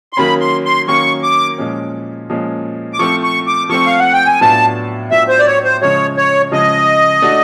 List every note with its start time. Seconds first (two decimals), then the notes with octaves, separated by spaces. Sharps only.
0.13 C6
0.17 D#3 F#3 A#3 C#4 B5
0.41 C6
0.65 C6
0.88 D#3 F#3 A#3 C#4 C#6
1.23 D6
1.58 A#2 F3 G#3 C#4
2.30 A#2 F3 G#3 C#4
2.93 D6
2.99 F3 A3 C4 C#6
3.23 C#6
3.47 D6
3.70 F3 A3 C4 C#6
3.86 F5
3.99 F#5
4.13 G5
4.26 G#5
4.41 A2 F#3 B3 D4 F4 A5
5.11 A2 F#3 B3 D4 F4 E5
5.29 C5
5.39 D5
5.46 C#5
5.64 C5
5.81 C#3 F3 G#3 C#5
6.17 C#5
6.52 C#3 F3 G#3 D#5
7.22 A3 D4 F#4